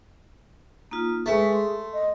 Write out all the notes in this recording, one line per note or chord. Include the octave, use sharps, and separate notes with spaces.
A#3 D#4 F4
G#3 A3 G#4 B4 C#6
C6
D#5